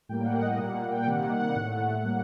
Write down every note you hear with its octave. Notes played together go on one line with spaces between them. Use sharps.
A2 G3 A#3 G5
F#5
D#5
A#2 G3 A#3 F#5
G5
C3 D#3 G3 A#3 F#5
F#5
F#5
A2 A3
A2 G3 A#3